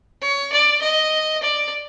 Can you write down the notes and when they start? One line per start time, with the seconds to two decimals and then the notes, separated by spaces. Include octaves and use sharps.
0.21 C#5
0.52 D5
0.82 D#5
1.43 D5